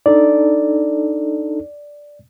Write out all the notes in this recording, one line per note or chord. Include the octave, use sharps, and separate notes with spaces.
D4 D#4 A4 D5